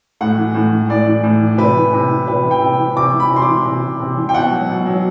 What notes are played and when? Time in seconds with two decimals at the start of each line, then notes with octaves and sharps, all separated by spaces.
0.21 A2 F#5
0.38 E3
0.54 A2
0.72 E3
0.89 A2 D5
1.07 E3
1.23 A2
1.41 E3
1.58 C3 B4
1.76 E3
1.93 C3
2.10 E3
2.27 C3 B4
2.45 E3
2.51 G5
2.61 C3
2.79 E3
2.96 C3 D6
3.13 E3
3.20 B5
3.31 C3 C6
3.42 D6
3.48 E3
3.65 C3
3.82 E3
4.00 C3
4.17 E3
4.29 G5
4.34 B2 F#5
4.52 F#3
4.69 B2
4.86 F#3